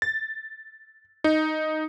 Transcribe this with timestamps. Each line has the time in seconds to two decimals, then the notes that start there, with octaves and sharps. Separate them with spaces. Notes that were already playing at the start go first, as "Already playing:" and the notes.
0.02 A6
1.24 D#4